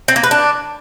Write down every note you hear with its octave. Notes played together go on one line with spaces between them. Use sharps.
C4
A#3
B4
D4